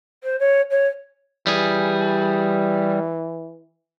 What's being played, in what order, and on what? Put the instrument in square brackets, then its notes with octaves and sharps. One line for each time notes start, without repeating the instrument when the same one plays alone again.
[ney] C5
C#5
C#5
[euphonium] E3 [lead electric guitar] G3 G#4